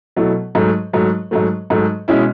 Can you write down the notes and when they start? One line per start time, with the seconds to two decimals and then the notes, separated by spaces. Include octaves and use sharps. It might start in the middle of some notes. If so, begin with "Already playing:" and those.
0.16 B2 F#3 A3 E4 A4
0.55 G#2 F#3 A3
0.93 G#2 F#3 A3
1.31 G#2 F#3 A3
1.70 G#2 F#3 A3
2.08 B2 G#3 C#4 E4